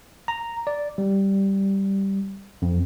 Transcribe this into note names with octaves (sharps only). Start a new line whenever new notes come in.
A#5
D5
G3
F2